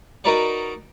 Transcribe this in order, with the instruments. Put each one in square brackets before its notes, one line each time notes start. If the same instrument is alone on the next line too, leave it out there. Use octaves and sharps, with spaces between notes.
[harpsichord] D#4 F#4 A#4 B4 D5 F#5